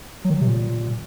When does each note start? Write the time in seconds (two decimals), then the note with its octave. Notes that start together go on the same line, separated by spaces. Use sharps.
0.25 F#3
0.30 D#3
0.36 F#3
0.41 C3
0.47 A#2